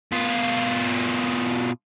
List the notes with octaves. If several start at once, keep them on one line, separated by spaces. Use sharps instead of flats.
B2 F4